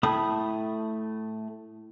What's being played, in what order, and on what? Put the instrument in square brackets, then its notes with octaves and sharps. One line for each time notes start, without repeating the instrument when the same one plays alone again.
[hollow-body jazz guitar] A2 [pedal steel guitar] A3 B5 D#6